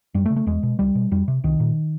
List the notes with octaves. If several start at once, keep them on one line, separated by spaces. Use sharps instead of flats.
F#2 G3
A3
C#3
A3
E2 G#3
B2
C#2 G3
B2
F2 G3
C3
C2 D#3
A#2